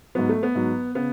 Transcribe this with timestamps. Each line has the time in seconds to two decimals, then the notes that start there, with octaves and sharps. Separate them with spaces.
0.15 G#2 F#3 B3
0.29 A3
0.43 B3
0.55 G#2 F#3
0.95 C#3 B3